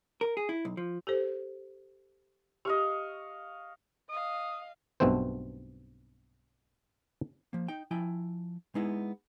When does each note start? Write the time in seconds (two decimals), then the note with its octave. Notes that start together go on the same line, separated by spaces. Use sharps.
0.21 A#4
0.37 G#4
0.49 E4
0.65 B1
0.77 F3
1.07 G4 A4 C5
2.65 G4 D#5 F5 C#6
4.09 D#5 F5 D#6
5.00 B1 G2 B2 A3 C4 C5
7.53 F3 A#3
7.68 D#4 G5
7.91 F3 E4 G5 G#5
8.75 G#3 B3 D#4 E4